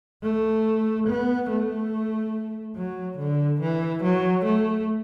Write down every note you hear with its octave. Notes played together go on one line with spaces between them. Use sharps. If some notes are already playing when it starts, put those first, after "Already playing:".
A3
B3
A3
F#3
D3
E3
F#3
A3